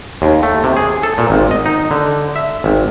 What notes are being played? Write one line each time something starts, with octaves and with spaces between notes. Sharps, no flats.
D#2
A3
C3
G#4
A4
A#2
G#1
D#5
D#4
D3
E5
G#1